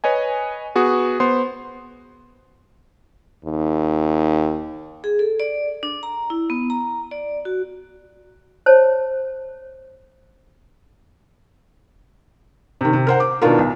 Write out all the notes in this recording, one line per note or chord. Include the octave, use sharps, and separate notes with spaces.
B4 C#5 D#5 G#5
B3 F#4 G#4
B3 C5 C6
D#2
G#4
A4
D5
D4
A#5
E4
B3
A#5
D5
F#4
C5 C#5 A5
C3 D#3
C3
A#4 C5 F#5
D6
B2 D#3 D4 F4 A#4
B1